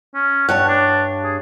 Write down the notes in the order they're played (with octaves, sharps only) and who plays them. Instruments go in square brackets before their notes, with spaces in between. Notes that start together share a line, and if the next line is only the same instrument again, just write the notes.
[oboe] C#4
[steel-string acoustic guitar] G2 C#5 A5 [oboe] F#5
[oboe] D4
G#4